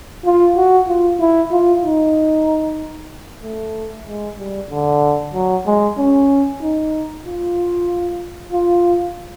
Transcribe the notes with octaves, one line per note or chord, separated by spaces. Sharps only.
F4
F#4
F4
E4
F4
D#4
A3
G#3
G3
D3
F#3
G#3
C#4
D#4
F4
F4